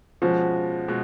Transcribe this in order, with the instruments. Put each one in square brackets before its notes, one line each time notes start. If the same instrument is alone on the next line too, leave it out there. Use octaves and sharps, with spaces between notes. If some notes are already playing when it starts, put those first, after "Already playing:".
[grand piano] B2 G#3 C#4 F#4 [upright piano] F3
[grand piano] B2 G#3 F#4